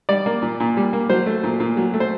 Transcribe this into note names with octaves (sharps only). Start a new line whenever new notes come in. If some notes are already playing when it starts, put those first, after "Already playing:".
G3 D5
A#3
A#2
A#2
G3
A#3
F#3 C5
A3
A#2
A#2
F#3
A3
C5